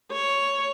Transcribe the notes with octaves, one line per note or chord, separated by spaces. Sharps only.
C#5